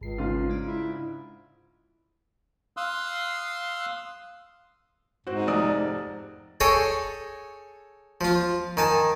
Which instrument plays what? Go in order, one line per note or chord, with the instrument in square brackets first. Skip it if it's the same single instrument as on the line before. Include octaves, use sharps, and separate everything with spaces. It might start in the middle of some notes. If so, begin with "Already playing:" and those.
[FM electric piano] G#1 C7 [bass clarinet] C#2
[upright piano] G#2 C#3 F4
[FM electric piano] G#3 D4
[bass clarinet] E4
[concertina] F5 C6 D#6 E6 F#6
[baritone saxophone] G#2 [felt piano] C4 F#4
[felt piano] F1 D5 D#6
[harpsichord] G#4 A4 C#5 D#5 G5 G#5
F3 F4
D#3 G#5 A5